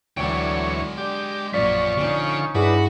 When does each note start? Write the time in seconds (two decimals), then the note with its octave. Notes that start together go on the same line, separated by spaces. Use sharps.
0.17 D2 D3 E3 F#3 G#3 C#5 G5
0.98 D4 G4 D6
1.53 A#1 F#2 F3 D5 C#6 B6
1.97 D3 C#4 D#4
2.55 G2 D4 E4 F#4 G#4 B4